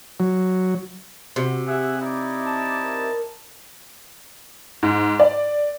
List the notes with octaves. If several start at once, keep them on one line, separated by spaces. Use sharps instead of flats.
F#3
C3 F#4
G4 G#4 E5 F#5
D#4 E4 D5 D6
A5
A#4
G#2
D5